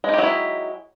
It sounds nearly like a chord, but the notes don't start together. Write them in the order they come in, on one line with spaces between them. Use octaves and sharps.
G#3 D#4 G4 F#3 E4